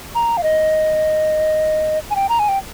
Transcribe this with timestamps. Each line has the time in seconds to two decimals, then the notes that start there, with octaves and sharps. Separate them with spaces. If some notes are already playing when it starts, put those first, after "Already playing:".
0.15 A#5
0.37 F5
0.43 D#5
2.11 G#5
2.16 G5
2.29 A#5
2.39 G#5
2.49 G5